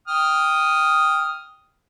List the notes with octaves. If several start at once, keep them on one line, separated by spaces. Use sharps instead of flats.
G5 D#6 F6